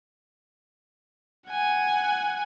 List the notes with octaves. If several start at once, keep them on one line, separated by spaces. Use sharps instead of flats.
F#5 G#5